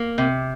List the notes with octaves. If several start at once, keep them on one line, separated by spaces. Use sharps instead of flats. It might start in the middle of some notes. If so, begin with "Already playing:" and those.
Already playing: A#3
C3